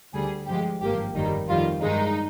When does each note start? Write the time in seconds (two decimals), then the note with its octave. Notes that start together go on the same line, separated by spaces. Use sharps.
0.14 D2 D3 G3 G#4
0.47 G2 F3 G#3 G4
0.81 G#1 G2 F3 A#3 G4
1.15 G1 F2 D#3 G3 A#3 D#4
1.48 F2 D#3 G3 F4
1.82 G2 D#3 G#3 D#4